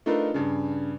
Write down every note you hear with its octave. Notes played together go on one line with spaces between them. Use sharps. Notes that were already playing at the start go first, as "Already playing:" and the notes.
A3 D4 D#4 F4 A#4 B4
G2 C#3